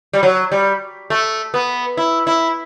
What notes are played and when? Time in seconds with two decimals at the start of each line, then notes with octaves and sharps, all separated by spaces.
0.13 G3
0.23 F#3
0.52 G3
1.10 A3
1.54 B3
1.97 E4
2.27 E4